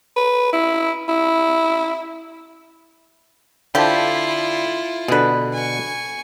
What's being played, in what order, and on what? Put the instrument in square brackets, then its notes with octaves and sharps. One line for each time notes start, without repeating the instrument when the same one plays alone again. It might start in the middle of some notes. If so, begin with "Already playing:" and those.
[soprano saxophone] B4
E4
E4
[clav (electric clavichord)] D3 [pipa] F3 G4 A4 [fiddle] E4 F4
[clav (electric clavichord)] B2 D3 [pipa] G#4 B4
[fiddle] G#5 C#6